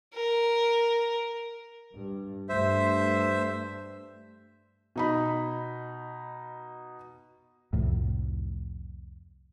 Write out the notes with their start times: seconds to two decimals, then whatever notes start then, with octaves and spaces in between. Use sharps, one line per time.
0.14 A#4
1.94 G2
2.49 G2 A3 C5 E5
4.96 B2 D#4 B5
7.73 C2 F2 A2